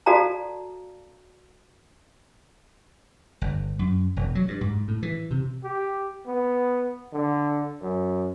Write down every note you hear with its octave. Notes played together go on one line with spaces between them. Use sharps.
F#4 A4 D5 F5 A5 A#5
G1
F#2
E1
F#3
G2
G#2
A2
E3
C3
G4
B3
D3
F#2